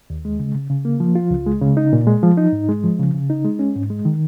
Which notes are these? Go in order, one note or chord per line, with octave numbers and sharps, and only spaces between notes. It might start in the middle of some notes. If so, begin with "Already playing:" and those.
D#2
G#3
C#3
C#3
C#3
A#3
F3
F4
C#2
G#3
C#3
D#4
A#2
G#3
F3
D#4
G#2
G#3
F3
C#3
C#3
D#4
G#3
C#4
G#2
G#3
D#3